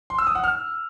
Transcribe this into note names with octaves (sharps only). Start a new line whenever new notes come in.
C6
E6
D#6
F#5
F6